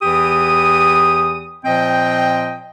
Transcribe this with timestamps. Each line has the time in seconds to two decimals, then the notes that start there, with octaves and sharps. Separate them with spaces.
0.02 E2 E3 G4 D#6
1.65 A#2 F3 C4 D#5 G5